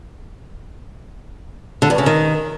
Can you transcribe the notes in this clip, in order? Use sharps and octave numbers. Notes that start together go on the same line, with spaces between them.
D3
G2
C#3
D#3